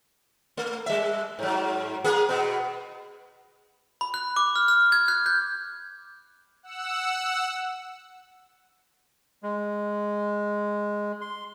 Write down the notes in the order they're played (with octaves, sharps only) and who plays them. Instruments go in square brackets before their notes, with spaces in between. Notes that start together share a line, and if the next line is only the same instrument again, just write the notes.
[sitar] A3
G3 E5
G#2 F#3
A#3 B3 G#4
B2 B3
[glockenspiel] B5
F#6
D6
F6
F6
G#6
F#6
G6
[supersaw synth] F#5 E6
[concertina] G#3
C6